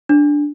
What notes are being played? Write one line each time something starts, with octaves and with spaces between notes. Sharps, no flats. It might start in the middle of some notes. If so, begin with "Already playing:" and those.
D4